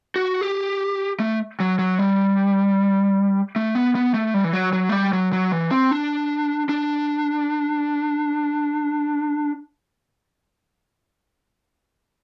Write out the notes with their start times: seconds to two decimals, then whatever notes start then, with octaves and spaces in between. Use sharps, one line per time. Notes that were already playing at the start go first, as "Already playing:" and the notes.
0.16 F#4
0.41 G4
1.20 A3
1.60 F#3
1.79 F#3
1.99 G3
3.56 A3
3.75 B3
3.95 B3
4.14 A3
4.34 G3
4.44 E3
4.53 F#3
4.73 F#3
4.89 A3
4.92 G3
5.13 F#3
5.33 F#3
5.52 E3
5.71 C4
5.91 D4
6.69 D4